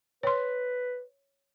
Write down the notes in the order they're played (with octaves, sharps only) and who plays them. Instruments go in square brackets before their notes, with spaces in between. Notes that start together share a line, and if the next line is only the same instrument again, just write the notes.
[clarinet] B4 [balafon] C#5 C6